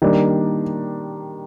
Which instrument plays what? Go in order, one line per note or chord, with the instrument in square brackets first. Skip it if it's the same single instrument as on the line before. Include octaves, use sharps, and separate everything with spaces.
[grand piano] D#3 G3 A#3 D4